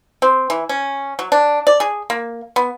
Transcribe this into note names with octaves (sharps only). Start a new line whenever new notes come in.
C4
E3
C#4
F#3
D4
D5
G#4
A#3
B3